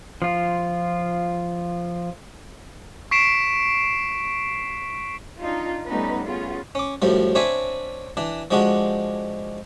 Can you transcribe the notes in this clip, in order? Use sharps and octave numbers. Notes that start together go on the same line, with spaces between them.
F3 F4
C#6 B6 C7 D7 E7
D4 D#4 F4
G3 A3 B3 C#4 D#4 B4
B3 C#4 F4 G#4
C#4 D6
F#2 A2 F3 G3
C4 D4 C#5 D5 E5 G#5
E3 D4
F3 G#3 D4 F#4 G4